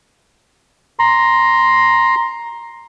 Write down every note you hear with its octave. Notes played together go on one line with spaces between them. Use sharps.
A#5 C6